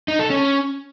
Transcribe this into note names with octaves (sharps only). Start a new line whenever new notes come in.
D#4
A4
C#4